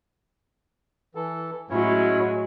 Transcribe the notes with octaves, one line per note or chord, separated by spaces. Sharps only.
E3 A4
A2 F#3 G#3 C#4 E4 C#5